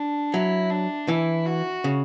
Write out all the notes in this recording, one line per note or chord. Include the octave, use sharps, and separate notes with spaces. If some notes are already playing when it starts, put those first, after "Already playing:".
Already playing: D4
F#3 E4
D4
E3 E4
F#4
C#3